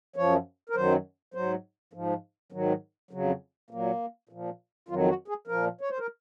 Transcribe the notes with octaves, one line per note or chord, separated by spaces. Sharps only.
F#2 F3 C#5
A#4
F#2 D#3 F#3 C5
G#2 F#3 C5
G#2 F3
G#2 D#3 F#3
F2 C#3 F#3
A#2 F#3 A#3
A#2 F3
F2 D#3 F#3 F4
F#4
G#4
A#2 F3 A#4
C#5
C5
A#4